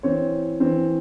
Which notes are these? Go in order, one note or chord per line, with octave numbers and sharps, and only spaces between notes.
E3 C4 C#5
E3 C4